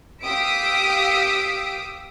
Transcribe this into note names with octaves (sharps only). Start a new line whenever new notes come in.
G4 F5 D#6 E6 B6 D7